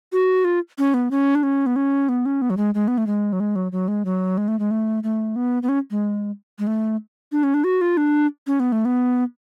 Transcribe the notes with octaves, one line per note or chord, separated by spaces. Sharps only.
F#4
F4
C#4
B3
C#4
D4
C#4
B3
C#4
B3
C#4
B3
F#3
G#3
G#3
B3
A3
G#3
F#3
G#3
F#3
F#3
G#3
F#3
G#3
A3
G#3
A3
A3
B3
B3
C#4
G#3
G#3
A3
D4
C#4
D4
F#4
F4
D4
C#4
B3
A3
B3